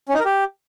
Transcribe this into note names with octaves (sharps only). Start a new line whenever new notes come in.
C#4
D#4
A#4
G4